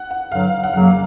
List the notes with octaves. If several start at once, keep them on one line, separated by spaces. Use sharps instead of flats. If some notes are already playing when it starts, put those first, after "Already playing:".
Already playing: F#5
F#5
G2 D3 F#3 F5
F#5
F#2 C#3 F#3 A#3 F5
F5